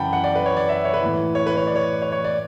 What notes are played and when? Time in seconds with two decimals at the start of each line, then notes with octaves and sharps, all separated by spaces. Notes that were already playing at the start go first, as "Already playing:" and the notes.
Already playing: F#2 C#3 E3 F#5 G5 A5 B5
0.13 F#5
0.24 D5
0.35 B4
0.46 C#5
0.57 D5
0.69 E5
0.85 C#5
0.93 B4
1.01 A2 E3
1.35 C#5
1.47 B4
1.57 C#5
1.67 D5
1.75 C#5
2.02 C#5
2.12 C#5
2.24 D5